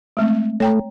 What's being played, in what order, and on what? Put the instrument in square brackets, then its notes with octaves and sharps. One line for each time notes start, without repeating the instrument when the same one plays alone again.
[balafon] G#3 A3 C4
[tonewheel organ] A3 [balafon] C#5 G5 A#5